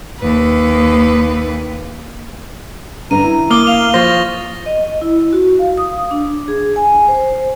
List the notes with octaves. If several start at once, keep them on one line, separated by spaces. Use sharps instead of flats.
D#2 B4
G2 D3 A#5 D#7
E4
A#3 D6 D#6 F6 G7
F5 F7
F3 C5 C#6 A6 A#6
D#5
E4
F#4
F5
D#6
D4
G#4
G#5
C5